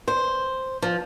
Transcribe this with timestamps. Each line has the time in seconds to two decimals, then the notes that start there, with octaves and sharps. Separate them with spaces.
0.08 C5
0.82 F3